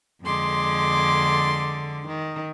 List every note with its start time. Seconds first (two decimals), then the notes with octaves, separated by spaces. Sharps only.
0.23 F2 D3 G#3 C6 D6
2.07 D#3